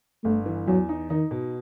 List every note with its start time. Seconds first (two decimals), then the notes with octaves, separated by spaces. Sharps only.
0.24 G1 A3
0.46 E3
0.68 E2 F#3
0.89 D#4
1.10 D#3 D#4
1.31 B2